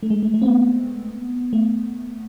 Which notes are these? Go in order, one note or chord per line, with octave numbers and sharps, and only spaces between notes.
A3
G#3
A3
A3
C4
B3
A3